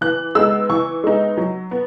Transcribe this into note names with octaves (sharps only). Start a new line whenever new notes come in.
E3 F#6
G#3 B3 D#4 E6
E3 C#6
G#3 B3 D#4
F#3
B3